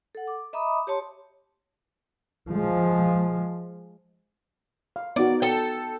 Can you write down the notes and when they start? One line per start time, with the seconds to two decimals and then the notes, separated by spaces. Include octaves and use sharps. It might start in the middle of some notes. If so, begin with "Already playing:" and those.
0.15 A4 F#5
0.28 D6
0.53 D#5 E5 A#5 B5 D6 D#6
0.87 G4 C#5 A5 C6
2.51 F3 G#3
4.96 F5
5.16 B3 D#4 F#4 D5
5.42 A4 G5